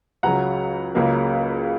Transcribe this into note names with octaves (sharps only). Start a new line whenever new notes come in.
C#2 C#3 F#3 F#5 A#5
C#2 C#3 F#3 A#3